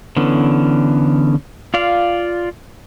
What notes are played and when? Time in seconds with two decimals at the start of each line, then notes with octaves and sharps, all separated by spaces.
0.17 D3 E3 B3 C#4
1.74 F4 D5 F5